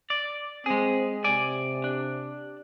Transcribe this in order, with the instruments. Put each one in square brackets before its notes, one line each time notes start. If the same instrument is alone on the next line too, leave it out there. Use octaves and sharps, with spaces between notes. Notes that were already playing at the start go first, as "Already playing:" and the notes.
[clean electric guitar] D5
[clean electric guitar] G#3 G#4 [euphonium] C4
[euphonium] C3 [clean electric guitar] D5 G#5
[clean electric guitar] D4